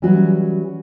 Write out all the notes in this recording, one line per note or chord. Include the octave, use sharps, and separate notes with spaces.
E3 F#3 G3 C#4 F#4